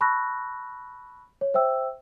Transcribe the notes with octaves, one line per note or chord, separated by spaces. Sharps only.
A5 B5 C#6 E6 F#6 A#6
C#5
C5 E5 G5 E6